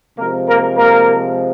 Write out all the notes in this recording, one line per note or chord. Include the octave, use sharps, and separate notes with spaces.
C3 F3 G#3 A#3 A#4
A#3 A#4
A#3 A#4